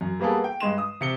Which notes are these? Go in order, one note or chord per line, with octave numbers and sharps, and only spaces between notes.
F#2
G3 A#3 B3 G#4 A4
G5
G2 G#3 C6 E7
D#6
C3 C#7 G7